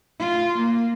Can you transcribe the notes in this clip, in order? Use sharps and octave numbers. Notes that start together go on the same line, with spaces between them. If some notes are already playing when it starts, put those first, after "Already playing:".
F4
A#3